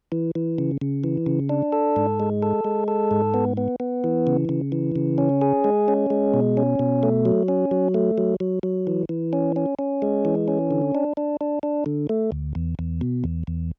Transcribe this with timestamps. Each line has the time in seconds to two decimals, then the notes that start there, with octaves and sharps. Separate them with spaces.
0.12 E3
0.35 E3
0.58 C#3
0.81 C#3
1.04 E3
1.26 C#3
1.49 D4
1.72 A4
1.96 G#2
2.20 G#3
2.42 A4
2.65 G#3
2.88 A4
3.11 G#2
3.34 B3
3.57 B3
3.80 B3
4.04 E3
4.27 C#3
4.49 C#3
4.72 E3
4.96 C#3
5.18 C#4
5.42 G#4
5.64 G#3
5.88 C#4
6.10 G#3
6.34 B2
6.57 C#4
6.79 B2
7.03 A3
7.25 F#3
7.48 C#4
7.71 F#3
7.94 A3
8.18 F#3
8.40 F#3
8.63 F#3
8.87 E3
9.09 E3
9.33 C#4
9.56 C#4
9.79 C#4
10.02 G#3
10.25 E3
10.48 C#4
10.71 D3
10.95 D4
11.17 D4
11.41 D4
11.63 D4
11.86 D3
12.09 A3
12.32 D2
12.55 E2
12.79 E2
13.01 B2
13.24 E2
13.47 E2